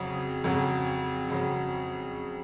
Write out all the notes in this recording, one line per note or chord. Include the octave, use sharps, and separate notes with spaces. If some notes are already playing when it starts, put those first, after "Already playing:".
Already playing: F2 C#3 F#3
F2 C#3 F#3
F2 C#3 F#3